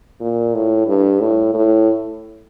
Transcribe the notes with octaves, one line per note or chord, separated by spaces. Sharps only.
A#2
A2
G2
A2
A2